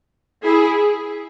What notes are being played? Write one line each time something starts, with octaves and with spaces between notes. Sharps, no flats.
E4 G#4